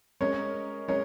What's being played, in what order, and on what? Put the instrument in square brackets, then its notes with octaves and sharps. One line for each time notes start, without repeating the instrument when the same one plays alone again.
[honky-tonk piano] G#3 C#4 A#4 D#5 [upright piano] C#5
[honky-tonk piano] G#3 C#4 A#4 D#5 [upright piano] C#5